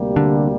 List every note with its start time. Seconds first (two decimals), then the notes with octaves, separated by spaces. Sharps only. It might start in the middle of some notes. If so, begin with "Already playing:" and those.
Already playing: D2 C3 G3 A#3
0.16 D3